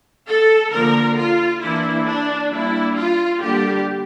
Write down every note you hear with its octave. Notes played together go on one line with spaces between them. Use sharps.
A4
D3 F3 A#3 A#4
F4
E3 A#3 D4 E4
D4
G3 A#3 D4 E4
F4
D3 G3 A#3 D4 G4